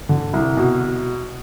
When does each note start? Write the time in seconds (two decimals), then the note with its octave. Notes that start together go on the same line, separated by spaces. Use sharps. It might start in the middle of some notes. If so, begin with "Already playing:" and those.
0.09 D3
0.33 C2
0.57 B2